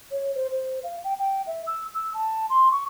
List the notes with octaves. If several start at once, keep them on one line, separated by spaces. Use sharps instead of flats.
C#5
C5
C5
F5
G5
G5
E5
E6
E6
A5
C6
C#6